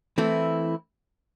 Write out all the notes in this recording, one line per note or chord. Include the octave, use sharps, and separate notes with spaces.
E3 A3 C4 E4